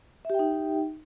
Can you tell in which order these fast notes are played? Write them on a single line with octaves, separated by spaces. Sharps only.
E5 G4 G5 D#4